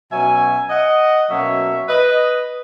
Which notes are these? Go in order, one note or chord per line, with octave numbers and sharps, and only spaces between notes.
B2 F#3 C#4 E5 G#5
D#5 F#5
B2 F#3 A#3 C#4 C#5 E5
B4 D#5